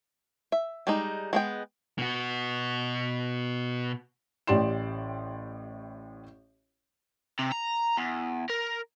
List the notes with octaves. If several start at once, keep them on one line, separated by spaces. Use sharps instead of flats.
E5
G3 G#3 D#4
G#3 B3 G5
B2 F#4
A1 A2 G4 D5 C6 E7
C3
A#5
E2
A#4